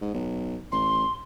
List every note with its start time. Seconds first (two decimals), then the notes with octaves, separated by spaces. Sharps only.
0.01 G#2
0.14 B1
0.72 A1 C6